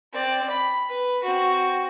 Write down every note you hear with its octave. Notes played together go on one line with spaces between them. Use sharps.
C4 D5
B5
B4
C4 F#4